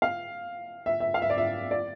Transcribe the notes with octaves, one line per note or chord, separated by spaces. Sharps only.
F5
E5
E5
F5
E5
D5
E5
D5